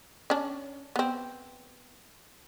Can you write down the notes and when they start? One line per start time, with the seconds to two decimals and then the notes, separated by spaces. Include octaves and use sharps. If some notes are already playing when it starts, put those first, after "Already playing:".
0.30 C#4 D4
0.96 B3 C4